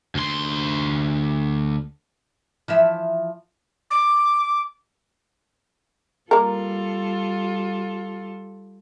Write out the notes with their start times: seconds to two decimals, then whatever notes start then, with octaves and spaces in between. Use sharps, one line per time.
0.15 D2 C6
2.68 E3 F3 E5
3.91 D6
6.31 G3 A#3 F4 A4 A#4